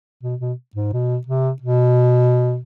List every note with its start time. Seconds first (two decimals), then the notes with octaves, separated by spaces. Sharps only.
0.23 B2
0.40 B2
0.76 G#2
0.93 B2
1.27 C3
1.62 B2